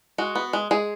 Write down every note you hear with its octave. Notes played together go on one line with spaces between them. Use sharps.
G#3 F#4
B3
G#3
G#3 G#4